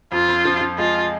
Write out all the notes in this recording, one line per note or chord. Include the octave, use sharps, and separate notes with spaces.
F2 F4
F2
F3
F3
G#3 F4